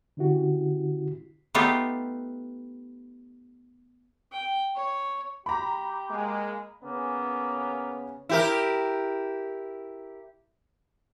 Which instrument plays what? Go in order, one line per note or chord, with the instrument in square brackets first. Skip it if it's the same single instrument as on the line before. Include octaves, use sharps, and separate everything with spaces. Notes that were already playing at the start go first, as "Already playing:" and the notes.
[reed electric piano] D3 C#4 E4 F#4 G4
[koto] A3 B3 D#4 F4 G4
[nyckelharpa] G5
C#5
[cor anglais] G4 [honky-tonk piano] A#5 B5
[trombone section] G#3 A#3
[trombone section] C#3 B3 C#4 [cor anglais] A#3
[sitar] E4 G4 A#4